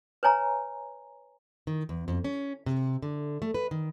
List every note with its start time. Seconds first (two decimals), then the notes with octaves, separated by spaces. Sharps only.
0.23 B4 C#5 G#5 A#5
1.67 D#3
1.89 E2
2.08 F2
2.24 C#4
2.66 C3
3.02 D3
3.42 A3
3.54 B4
3.71 D#3